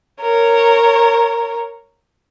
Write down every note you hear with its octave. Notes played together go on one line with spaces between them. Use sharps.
A#4 C#5